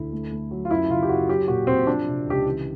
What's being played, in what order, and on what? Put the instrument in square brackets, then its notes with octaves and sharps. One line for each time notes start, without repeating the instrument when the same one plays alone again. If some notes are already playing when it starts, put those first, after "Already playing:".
Already playing: [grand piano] D2 E4
A3
A3
F#3
F4
F#2 E4
C#3 F4
G4
F#2 F#4
F#3 G4
A#2 F#4
A#2 C4
F3 D4
C3
C#2 G4
E3